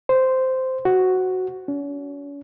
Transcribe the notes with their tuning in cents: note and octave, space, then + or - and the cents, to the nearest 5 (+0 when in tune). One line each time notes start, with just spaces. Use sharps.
C5 -10
F#4 +5
C#4 +40